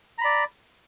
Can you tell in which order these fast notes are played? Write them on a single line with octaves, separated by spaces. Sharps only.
A#5 B5 D5